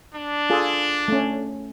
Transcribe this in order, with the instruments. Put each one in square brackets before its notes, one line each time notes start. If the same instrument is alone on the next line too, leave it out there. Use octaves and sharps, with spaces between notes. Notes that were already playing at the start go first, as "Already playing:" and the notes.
[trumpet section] D4
[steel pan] F4 G#4 A4
A3 C#4